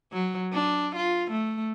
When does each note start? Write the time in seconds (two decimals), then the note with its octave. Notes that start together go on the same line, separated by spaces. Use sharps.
0.12 F#3
0.53 D4
0.96 F4
1.31 A3